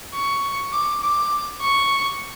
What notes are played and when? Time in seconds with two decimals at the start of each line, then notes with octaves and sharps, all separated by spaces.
0.14 C#6
0.72 D6
1.03 D6
1.62 C#6